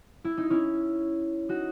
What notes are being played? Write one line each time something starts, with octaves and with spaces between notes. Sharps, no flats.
E4
D#4
C#4 E4
D#4 F#4